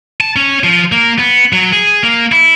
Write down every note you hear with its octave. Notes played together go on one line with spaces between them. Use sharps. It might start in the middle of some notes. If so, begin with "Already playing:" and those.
A5
C#4
F3
A#3
B3
F#3
G#4
A#3
E4